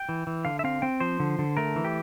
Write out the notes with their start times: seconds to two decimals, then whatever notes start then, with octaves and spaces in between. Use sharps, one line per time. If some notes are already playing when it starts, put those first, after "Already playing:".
Already playing: G5
0.09 E3
0.27 E3
0.45 D3 F5
0.59 E5
0.64 C4 F5
0.82 C4 G5
1.00 F3 C5
1.20 D3
1.39 D3
1.57 A3 A#4
1.76 E3
1.85 G4